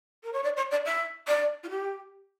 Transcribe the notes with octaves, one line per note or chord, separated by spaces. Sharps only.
A#4
C#5
D5
C#5
D5
E5
D5
F4
G4